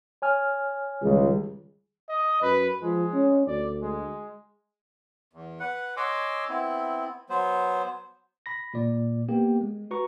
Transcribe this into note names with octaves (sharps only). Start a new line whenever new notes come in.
C#5 G#5 F6
C#2 D#3 G3 G#4
D#5
F#2 B4
F3 G#3
C#4
D2 D5
G#3
E2
B4 F#5
C#5 D#5 G#5 C6 D6 E6
B3 C4 E4
F#3 B3 C5
B5 A#6
A#2 D5
A#3 B3 G4 G5
G#3
F#4 B4 A#5 C#6